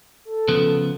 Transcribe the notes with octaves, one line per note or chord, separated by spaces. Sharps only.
A4
C#3 F3 B3